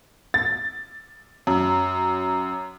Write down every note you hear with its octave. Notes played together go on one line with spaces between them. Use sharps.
A6
F#2